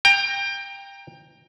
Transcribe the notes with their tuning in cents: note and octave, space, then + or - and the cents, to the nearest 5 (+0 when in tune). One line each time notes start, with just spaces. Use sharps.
G5 +20 A#5 +0